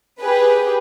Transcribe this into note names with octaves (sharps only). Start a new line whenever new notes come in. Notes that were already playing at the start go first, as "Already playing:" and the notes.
G4 G#4 B4